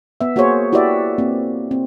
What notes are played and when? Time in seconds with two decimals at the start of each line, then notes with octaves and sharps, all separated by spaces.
0.21 B3 E5
0.36 A#3 F#4 G#4 C5 C#5
0.72 E4 F#4 G4 B4 D5 E5
1.18 A#3 C4
1.71 C4